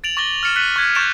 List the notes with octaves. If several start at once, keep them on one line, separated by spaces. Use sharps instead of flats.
A6 D7 F7 F#7
C#6 D6 A6 A#6 F#7 G7
F6 A6 C#7 E7 F7
F#6 B6 D#7 F#7 G7
C#6 F#6 G#6 B6
C#6 G6 A6 D7 E7 F7